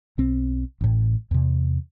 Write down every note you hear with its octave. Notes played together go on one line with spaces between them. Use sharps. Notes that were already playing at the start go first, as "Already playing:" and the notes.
B1 C4
A1 A2
E2 C3